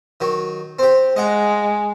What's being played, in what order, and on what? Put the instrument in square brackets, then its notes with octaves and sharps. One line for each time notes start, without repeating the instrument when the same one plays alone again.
[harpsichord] D#3 F#3
C4 G4
[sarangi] G#3 [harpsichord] D#5 F#5 A#5